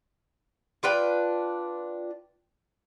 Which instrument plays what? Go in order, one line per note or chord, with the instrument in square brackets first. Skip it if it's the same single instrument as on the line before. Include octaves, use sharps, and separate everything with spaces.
[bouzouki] D4 F4 B4 G5